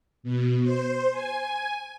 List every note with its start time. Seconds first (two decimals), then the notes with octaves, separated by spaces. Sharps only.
0.23 B2
0.63 C5
1.12 G#5